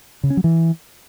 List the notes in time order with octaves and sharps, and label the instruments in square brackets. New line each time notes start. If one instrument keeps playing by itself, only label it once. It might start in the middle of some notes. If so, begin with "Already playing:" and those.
[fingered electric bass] C#3
C#4
F#3
E3